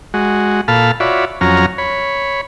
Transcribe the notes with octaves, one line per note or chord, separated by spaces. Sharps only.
G#3 F#4
A#2 A4 F5 A5 B5 F6
F4 F#4 C#5 D5 E5 B5
F2 F#3 C#4 A#5 F6
C#5 B5